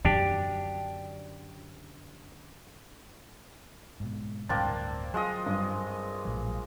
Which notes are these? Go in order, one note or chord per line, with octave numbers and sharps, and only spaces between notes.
F#2 D3 D4 G4
G#2 B2
D1 D2 G2 A#3 C4 D4 A6
F#3 G#3 F4 D#5
G2
A#1 A2 F#3